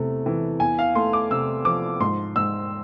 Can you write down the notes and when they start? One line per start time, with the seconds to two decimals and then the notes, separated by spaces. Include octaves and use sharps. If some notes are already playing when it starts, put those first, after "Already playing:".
Already playing: E2 C3 A3
0.26 E3
0.60 E2 G#5
0.79 F5
0.95 A3 C6
1.13 D6
1.31 C3 E6
1.65 F3 D6
2.00 G#2 C6
2.36 G#2 E6